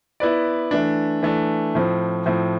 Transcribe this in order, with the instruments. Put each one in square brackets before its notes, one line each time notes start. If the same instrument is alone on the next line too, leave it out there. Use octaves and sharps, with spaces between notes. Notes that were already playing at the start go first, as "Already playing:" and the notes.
[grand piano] B3 E4 B4 D5
E3 A3 D4
E3 A3 D4
A2 F3 C4
A2 F3 C4